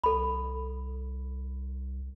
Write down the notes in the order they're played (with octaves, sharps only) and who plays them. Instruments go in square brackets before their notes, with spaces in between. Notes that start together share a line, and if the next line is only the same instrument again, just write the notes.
[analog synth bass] C2 [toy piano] A4 B5